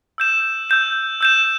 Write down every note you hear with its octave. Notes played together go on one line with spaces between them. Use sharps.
E6 G6 E7
E6 G6 E7
E6 G6 E7